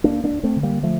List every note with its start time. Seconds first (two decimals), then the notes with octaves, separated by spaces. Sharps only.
0.04 D2 A#3 D4
0.24 A#3 D4
0.30 D2
0.43 A3 C4
0.56 D3
0.63 G3 A#3
0.83 F3 A3